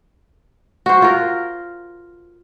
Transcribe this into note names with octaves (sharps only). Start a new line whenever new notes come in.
F#4 C5
F4 A#4